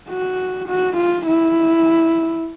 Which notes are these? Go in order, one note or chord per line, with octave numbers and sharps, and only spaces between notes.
F#4
F#4
F4
E4